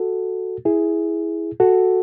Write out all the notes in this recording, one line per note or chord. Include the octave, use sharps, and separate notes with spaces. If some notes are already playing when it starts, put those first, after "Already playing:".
Already playing: F#4 A4
E4 G#4
F#4 A4